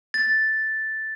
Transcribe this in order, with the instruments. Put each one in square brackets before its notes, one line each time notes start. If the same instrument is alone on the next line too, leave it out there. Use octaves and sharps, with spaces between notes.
[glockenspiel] A6